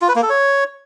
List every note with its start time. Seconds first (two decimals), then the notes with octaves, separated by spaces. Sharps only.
0.01 F4
0.08 B4
0.15 A#3
0.22 A4
0.30 C#5